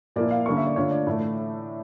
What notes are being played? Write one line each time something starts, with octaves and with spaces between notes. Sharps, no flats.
A#2 F3 A#3 E4 D5
F5
D3 G3 A#3 C#4 C#6
E5
D5
D3 A3 D4 F4 C#5
D5
A2 E3 A3